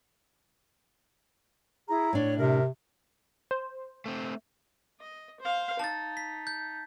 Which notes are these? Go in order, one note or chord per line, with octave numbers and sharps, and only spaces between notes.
E4 G#4 A#5
A2 D4 C#5
C3 A#4 E5
C5
A3 C4
D#5
C5 F5
D#4 A5 A6
B6
G6